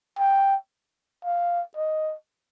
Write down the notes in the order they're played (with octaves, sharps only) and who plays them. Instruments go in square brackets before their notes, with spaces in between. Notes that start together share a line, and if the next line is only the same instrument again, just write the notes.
[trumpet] G5
F5
D#5